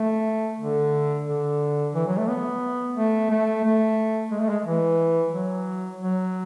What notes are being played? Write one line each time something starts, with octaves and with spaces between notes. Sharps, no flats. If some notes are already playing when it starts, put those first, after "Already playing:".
Already playing: A3
D3
D3
E3
F#3
A3
B3
A3
A3
A3
G#3
A3
G#3
E3
F#3
F#3